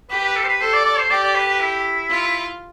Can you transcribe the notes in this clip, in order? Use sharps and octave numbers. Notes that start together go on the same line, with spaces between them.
G4 B4
B4
A4
C5
B4
A4 C5
D5
D5
C5
G4 D5
D5
B4
B4
E4
F4